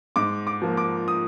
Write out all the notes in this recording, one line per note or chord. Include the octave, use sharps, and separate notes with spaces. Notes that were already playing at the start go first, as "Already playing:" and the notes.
G#2 D6
D6
F3 A#3
D6
D#6